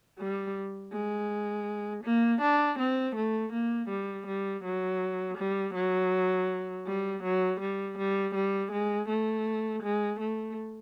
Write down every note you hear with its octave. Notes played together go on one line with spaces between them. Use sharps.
G3
G#3
A#3
D4
C4
A3
A#3
G3
G3
F#3
G3
F#3
G3
F#3
G3
G3
G3
G#3
A3
G#3
A3